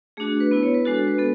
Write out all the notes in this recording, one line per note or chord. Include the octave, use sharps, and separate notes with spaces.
A3 D4 F#4 G#4
B4
B3 E4 B4
C#5
B4
G#3 D4 F#4 A4
A4
B4
B3 A4